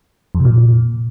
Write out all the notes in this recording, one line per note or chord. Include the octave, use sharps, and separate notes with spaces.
F2
C3
A#2